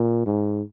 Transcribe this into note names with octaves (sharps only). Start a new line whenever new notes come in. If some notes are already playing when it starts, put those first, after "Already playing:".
Already playing: A#2
G#2